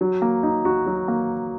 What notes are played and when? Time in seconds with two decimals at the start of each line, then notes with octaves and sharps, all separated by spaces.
0.01 F#3
0.22 A#3
0.43 D#4
0.65 F#4
0.86 F#3
1.08 A#3